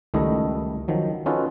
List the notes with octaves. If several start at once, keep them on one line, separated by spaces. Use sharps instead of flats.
C#2 D#3 G3 A3 E4 D#5
D#3 F3 F#3
C#4 D#4 F4 F#4 A4 B4